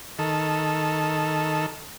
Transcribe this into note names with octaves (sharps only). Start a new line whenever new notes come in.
D#3 A4